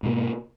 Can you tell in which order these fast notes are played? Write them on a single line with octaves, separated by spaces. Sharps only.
G#2 B2 A#3